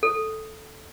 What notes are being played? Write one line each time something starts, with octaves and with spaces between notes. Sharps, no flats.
A4